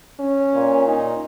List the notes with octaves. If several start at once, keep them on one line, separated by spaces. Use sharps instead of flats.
C#4
A#2
D#4